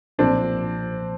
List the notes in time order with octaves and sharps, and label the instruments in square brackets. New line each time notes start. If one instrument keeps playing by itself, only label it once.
[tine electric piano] B1 A#2 F3 [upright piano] C4 D4